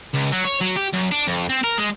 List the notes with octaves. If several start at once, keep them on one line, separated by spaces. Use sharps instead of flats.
C#2
F#3
C#5
F#3
G4
F#2
D4
F2
C4
A#4
G#3